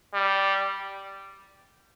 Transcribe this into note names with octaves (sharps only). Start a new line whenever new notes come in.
G3